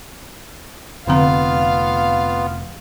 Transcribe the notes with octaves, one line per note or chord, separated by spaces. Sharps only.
F1 D3 B3 C4 F4 F5 A#5